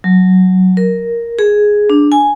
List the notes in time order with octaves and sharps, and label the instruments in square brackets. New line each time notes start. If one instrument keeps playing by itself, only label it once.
[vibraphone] F#3
A#4
G#4
D4
G#5